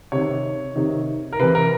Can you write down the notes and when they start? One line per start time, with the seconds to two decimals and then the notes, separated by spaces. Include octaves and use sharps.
0.12 C3 D#3 C#5
0.76 C3 D#3
1.32 A#4
1.39 C3 E3 B4
1.55 A#4